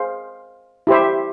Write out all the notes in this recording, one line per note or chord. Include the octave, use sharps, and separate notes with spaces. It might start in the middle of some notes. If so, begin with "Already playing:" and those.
Already playing: G#4 C5 F5
E4 G4 C5 E5